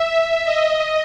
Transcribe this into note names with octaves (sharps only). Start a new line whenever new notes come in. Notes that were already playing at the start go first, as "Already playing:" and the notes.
Already playing: E5
D#5